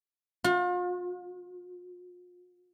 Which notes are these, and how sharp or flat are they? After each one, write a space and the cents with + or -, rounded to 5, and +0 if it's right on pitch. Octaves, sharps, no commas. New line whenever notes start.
F4 +40